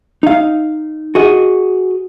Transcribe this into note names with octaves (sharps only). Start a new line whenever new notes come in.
D#4 F5
F#4 G#4 D#5